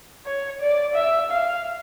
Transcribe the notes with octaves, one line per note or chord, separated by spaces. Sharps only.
C#5
D5
E5
F5